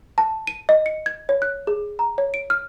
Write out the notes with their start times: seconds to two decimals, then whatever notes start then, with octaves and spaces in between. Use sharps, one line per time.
0.18 A5
0.47 D#7
0.69 D#5
0.86 C#7
1.06 G#6
1.29 C#5
1.42 F#6
1.67 G#4
1.99 A#5
2.18 C#5
2.34 D7
2.50 F6